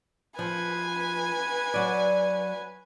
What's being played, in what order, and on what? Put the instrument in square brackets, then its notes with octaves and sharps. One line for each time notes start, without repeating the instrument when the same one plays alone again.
[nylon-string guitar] F3 [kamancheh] B4 G#5
[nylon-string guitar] F#3 D5